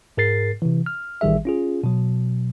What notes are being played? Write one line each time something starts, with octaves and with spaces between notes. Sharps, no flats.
G#2 G#4 A#4 A6 C7
C3 E3
F6
A1 D#3 G3 G#4 E5
C#4 F4 G#4
B2 F#3